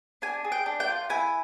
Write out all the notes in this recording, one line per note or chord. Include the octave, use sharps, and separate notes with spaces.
D4 G#5
G#4
G5
D4
G5
F4
E4 G#5